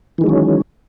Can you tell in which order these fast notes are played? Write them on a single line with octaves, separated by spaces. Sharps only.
E3 D#3 G#3 F#3 C#4